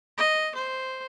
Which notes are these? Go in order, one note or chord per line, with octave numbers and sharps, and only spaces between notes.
D#5
C5